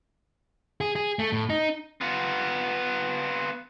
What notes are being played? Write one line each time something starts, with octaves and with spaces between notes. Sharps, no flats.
G#4
G#4
A3
A2
D#4
B3 F4